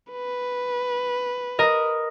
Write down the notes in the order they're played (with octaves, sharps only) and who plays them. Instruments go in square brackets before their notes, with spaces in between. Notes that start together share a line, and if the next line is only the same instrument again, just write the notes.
[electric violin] B4
[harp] A#4 D#5